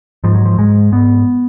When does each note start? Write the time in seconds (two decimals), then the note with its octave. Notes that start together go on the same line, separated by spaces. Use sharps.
0.24 G#2 F3
0.35 F#3
0.45 F3
0.58 G#2 G#3
0.92 G#2 B3